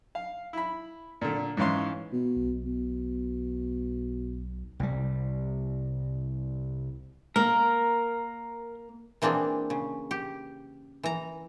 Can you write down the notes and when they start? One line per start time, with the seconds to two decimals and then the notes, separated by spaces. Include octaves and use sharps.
0.15 F5
0.53 E4 B5
1.21 A#2 D3
1.57 G#2 E3 C#4 F5 C6
2.13 B2
2.36 B1
2.65 B2
4.79 C2 G3
7.36 A#3 A#4
9.22 E3 A#3 C4 D4 G#4
9.70 C#3
10.11 G4
11.03 E3 A#5